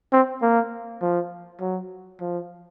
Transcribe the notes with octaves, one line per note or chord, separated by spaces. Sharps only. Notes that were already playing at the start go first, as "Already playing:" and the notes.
C4
A#3
F3
F#3
F3